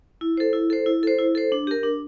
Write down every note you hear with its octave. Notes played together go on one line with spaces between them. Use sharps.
E4
A4 C5
E4
A4 C5
E4
A4 C5
E4
A4 C5
D4
G4 A#4
D4